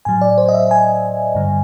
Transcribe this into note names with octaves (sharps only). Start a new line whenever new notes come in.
A2 F#3 G#5
D5
C5
D#5
E5
G#5
G2 D3 G3